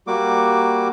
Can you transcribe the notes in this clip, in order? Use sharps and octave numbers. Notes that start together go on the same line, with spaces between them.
G3 A#3 F#4 D6